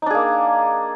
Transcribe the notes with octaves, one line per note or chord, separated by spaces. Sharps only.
A#3 D4 D#4 G#4